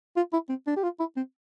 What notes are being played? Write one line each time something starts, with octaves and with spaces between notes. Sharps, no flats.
F4
E4
C4
D4
G4
F4
E4
C4